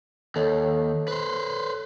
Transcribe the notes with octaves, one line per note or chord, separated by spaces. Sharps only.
D#2 A4 C#5
B4 C5